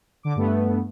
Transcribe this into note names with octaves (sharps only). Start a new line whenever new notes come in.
D3 D6
G2 A3 B3